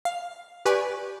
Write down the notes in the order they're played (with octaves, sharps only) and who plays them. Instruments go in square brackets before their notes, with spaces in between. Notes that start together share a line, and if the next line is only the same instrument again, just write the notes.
[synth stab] F5
G4 B4 D5 G#5 C#6